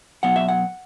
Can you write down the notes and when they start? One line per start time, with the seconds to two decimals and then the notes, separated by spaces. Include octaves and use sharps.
0.23 B2 F#3 B3 F#5
0.36 E5
0.48 F#5